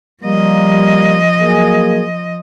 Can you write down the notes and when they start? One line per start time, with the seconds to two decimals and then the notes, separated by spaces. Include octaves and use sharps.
0.24 F3 G3 A#3 D#5
1.40 F#3 A#3 G#4